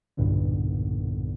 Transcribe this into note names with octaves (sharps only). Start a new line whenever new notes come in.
B1 E2 G2 A#2 D3